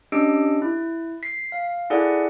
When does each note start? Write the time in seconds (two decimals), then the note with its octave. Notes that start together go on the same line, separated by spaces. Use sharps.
0.12 C#4 D4 G4 D#5 E6 D7
0.62 E4
1.23 B6 C7
1.52 F5
1.90 E4 G#4 A4 D5 F#5 G#5